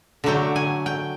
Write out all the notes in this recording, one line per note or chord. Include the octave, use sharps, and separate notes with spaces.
D3 F#3 A3 G5
G#5
G5